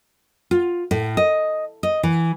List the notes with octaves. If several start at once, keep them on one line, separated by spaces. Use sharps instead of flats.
F4
A2
D#5
D#5
E3